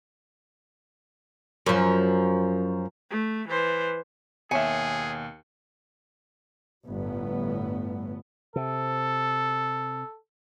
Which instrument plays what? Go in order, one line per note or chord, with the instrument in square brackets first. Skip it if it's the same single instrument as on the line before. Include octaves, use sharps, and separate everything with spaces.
[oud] F#2 F3
[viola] A3
E3 C5
[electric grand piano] D#2 C#7 [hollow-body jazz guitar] B2 C#5 E5 [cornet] G#4 [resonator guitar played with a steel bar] G#5
[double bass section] G1 A2 B3
[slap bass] C3 [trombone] A4